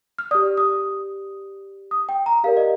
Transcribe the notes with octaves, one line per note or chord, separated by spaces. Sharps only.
F6
G4 D5 D#6
D#6
D#6
G5
A#5
G4 A#4 D5 F5
D#5